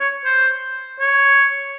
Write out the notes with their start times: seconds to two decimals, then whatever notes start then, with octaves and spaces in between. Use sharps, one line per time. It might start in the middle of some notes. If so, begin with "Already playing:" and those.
0.01 C#5
0.25 C5
1.00 C#5